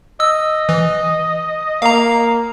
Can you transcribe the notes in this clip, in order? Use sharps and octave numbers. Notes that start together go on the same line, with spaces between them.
D#5 E6
E3
A#3 F5 A#5